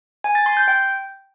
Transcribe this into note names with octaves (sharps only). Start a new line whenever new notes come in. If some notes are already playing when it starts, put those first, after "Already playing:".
G#5
A6
C6
G6
G5